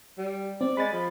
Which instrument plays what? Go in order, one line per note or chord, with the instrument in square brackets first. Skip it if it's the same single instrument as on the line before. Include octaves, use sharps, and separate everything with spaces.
[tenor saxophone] G3
[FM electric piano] C4 [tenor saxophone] D5
[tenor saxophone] G#3 [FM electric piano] B5 A6
[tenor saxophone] F3